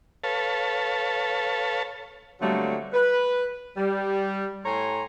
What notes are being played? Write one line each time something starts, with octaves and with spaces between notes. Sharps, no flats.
A4 B4 C#5 F5 A5
D3 F#3 G3 A3 A#3 C4
B4
G3
A2 C#5 G#5 A#5 C6